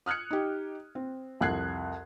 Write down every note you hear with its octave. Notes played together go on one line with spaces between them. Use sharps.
D#6 F6 F#6 G#6 C#7
D#4 G4
C4
C2 F2 F#6 G#6 C7